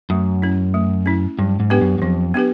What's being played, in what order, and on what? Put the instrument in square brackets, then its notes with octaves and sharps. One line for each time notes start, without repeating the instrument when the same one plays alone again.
[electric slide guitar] F#2 [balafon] A3
[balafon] C#4 E4
A3
C#4 E4
[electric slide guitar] G2 [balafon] F#3
[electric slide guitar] G#2
[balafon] B3 D4 G4 B4
[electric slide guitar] F#2
F#2
[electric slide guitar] F2 [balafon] F#3
[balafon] B3 D4 G4 B4